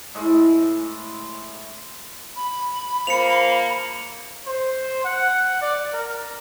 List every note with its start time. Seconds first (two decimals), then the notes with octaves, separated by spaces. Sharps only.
0.15 A2 G#3
2.36 B5
3.07 F3 A#3 C#7 F7
4.46 C5
5.04 F#5
5.61 D5
5.93 A#4